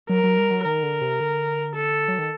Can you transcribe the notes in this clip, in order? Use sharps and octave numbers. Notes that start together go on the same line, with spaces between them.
F#3 A#4
F#3
G3
F#3
D#3 A#4
D3
C3
D3
A4
F#3
D#3